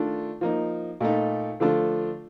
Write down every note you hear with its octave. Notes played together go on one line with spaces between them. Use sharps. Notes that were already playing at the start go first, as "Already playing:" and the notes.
Already playing: D#3 A3 D4 F4
F3 A#3 D#4
A#2 A3 D#4
D3 F3 A3 D4 F4